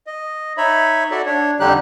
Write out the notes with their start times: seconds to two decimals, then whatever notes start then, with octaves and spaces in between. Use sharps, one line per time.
0.07 D#5
0.57 D#4 C#5 E5 B5
1.11 F#4 A4 D5 E5
1.26 D4 C#5
1.60 F2 D3 G3 D#4 G4 F#6